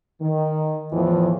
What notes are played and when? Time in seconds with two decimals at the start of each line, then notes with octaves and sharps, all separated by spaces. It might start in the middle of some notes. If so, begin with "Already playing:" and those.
0.21 D#3
0.93 E2 A2 E3 F3